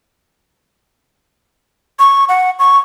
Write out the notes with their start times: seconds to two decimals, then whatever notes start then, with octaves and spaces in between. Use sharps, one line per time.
1.99 C#6
2.29 F#5
2.59 C#6